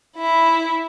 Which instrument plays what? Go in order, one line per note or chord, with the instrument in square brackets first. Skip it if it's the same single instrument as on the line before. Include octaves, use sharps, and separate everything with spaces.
[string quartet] E4 E5